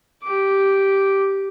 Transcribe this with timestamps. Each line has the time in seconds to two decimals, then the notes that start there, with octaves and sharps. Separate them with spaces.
0.23 G4 D6